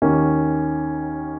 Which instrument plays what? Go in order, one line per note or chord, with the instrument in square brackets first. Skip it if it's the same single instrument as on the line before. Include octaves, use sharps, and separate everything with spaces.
[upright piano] D#2 D#3 A#3 C#4